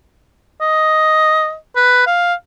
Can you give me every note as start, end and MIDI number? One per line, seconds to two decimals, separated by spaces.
0.61 1.55 75
1.76 2.03 71
2.07 2.34 77